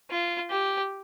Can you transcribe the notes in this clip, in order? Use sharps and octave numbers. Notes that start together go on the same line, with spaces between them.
F4
G4